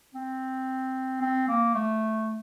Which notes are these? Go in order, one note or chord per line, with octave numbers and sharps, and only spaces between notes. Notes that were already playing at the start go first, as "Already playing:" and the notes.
C4
C4
A#3
A3